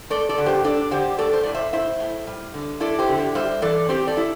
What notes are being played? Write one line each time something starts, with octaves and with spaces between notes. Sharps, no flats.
A3 A4 D5
A4 D5
D3
G4 C5
D4 A4 D5
D3 G4 C5
A3 A4 D5
C5
A2 D5
C5 E5
E4 C5 E5
A2
G3
D3
E4 A4 D5
G4 C5
D3
G4
G3 C5 E5
E3 A4 D5
C4 G4 C5
A4 D5
E4